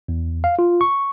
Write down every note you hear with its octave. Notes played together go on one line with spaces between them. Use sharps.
E2
F5
F4
C#6